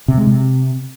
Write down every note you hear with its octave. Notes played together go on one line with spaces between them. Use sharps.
C3
G#3
C3